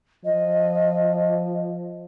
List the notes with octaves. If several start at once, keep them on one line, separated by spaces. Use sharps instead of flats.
F3 D#5